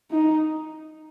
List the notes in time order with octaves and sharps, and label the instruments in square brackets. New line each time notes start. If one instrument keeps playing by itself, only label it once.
[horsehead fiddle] D#4